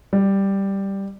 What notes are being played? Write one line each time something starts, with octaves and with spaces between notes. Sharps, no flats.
G3